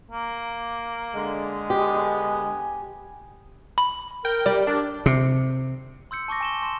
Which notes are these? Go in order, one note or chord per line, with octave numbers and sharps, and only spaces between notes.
A#3
D3 G#3
B3 G4 G#5
B5
A#4 G5
G3 D5
D4 A#4
C3
C6 E6 G6 C#7
A5 C#6 D6 A#6
G#5 E7 G7
C6 E7